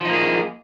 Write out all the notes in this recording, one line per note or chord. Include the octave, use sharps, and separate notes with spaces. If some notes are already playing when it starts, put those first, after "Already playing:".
F3 A#3 D#4 G#4